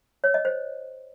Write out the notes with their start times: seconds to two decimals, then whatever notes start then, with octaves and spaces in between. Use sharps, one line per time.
0.24 C#5
0.34 D#5
0.45 C5